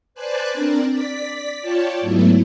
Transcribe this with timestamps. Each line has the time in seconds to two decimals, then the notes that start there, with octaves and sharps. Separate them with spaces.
0.14 B4 C5 D5 G#5 A5 F#6
0.54 C4 D4 A#4 D5
0.90 D5 B6
1.62 F4 C#5 D5 G5 A5
2.01 G#2 F#3 A3 B3 E4